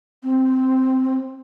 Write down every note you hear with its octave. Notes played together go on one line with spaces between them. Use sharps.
C4